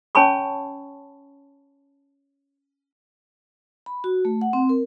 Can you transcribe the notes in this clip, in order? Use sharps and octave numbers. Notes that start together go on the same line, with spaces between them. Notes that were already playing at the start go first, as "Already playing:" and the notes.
C#4 C#5 G#5 A5 B5 C#6
B5
F#4
A3
F#5
C4
A#4